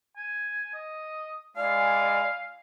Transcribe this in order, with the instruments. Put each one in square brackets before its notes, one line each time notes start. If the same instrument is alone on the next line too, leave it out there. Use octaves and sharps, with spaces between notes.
[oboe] G#5
D#5
[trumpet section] G#3 E4 G#5 [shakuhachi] D5 [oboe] F5